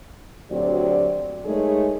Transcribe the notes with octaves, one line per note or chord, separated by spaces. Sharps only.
D2 F#3 C4 G4 D5
G#3 A3 D#4 G#4 A#4 C#5